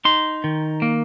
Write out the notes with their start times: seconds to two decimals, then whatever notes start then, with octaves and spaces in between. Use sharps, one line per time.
0.05 D#4 C6
0.44 D#3
0.82 A#3